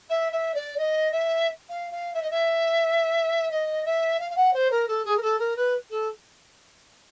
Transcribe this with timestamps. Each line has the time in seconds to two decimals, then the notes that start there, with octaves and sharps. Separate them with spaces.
0.09 E5
0.32 E5
0.54 D5
0.77 D#5
1.11 E5
1.69 F5
1.91 F5
2.13 E5
2.22 D#5
2.30 E5
3.50 D#5
3.85 E5
4.19 F5
4.30 F5
4.36 F#5
4.53 C5
4.70 A#4
4.87 A4
5.04 G#4
5.16 A#4
5.21 A4
5.39 A#4
5.56 B4
5.90 A4